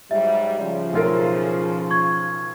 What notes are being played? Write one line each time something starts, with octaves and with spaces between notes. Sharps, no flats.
G#2 F#3 G3 E5
C#3 F3
B1 F4 A#4
C#6 G#6